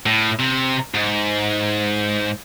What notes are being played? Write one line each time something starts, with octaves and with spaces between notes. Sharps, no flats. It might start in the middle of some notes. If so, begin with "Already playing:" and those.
A2
C3
G#2